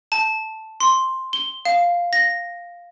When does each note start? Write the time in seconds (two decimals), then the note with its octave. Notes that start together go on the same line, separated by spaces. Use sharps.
0.12 A5
0.80 C6
1.33 G7
1.65 F5
2.13 A#6